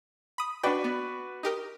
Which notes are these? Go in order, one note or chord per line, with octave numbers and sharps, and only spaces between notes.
B5 D#6
D4 F#4 B4 D5 G5
B3
D#4 G4 A#4